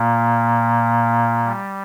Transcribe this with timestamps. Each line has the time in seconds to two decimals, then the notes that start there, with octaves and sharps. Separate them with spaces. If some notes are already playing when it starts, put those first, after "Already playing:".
Already playing: A#2 A#3
1.45 G3